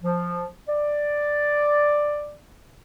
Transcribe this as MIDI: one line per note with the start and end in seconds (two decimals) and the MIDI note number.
0.03 0.47 53
0.68 2.35 74